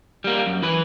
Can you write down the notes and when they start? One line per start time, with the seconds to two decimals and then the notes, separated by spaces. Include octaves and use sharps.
0.24 G3 A#3
0.47 F#2
0.62 E3 B4